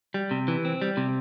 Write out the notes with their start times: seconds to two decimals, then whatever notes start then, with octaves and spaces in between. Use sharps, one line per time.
0.14 G3
0.31 C3
0.48 E3
0.65 C4
0.82 G3
0.97 C3